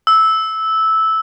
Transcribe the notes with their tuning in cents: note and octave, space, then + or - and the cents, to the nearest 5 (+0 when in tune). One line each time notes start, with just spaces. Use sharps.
E6 -10